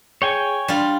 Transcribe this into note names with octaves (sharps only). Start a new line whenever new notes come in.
G#4 C#5 G5 G#5
G3 D4 F4